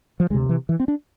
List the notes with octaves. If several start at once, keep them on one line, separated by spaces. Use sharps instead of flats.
F3
D2 C3 G#3
E3
E3
C4
D4